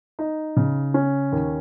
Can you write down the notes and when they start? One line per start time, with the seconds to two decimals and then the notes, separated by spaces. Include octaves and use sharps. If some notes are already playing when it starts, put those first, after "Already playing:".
0.19 D#4
0.57 C#3
0.94 C#4
1.32 D#2